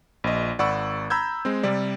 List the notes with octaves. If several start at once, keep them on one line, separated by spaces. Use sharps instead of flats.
A#1 D#5
G#1 D5 F#5 B5 C#6 E6
A#5 B5 E6 G6 G#6
G#3 C4
C3 G3 D5